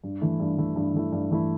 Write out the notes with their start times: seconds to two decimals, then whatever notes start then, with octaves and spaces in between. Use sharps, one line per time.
0.04 G2
0.21 E3 A3 E4
0.40 G2
0.58 E3 A3 E4
0.76 G2
0.94 E3 A3 E4
1.12 G2
1.31 E3 A3 E4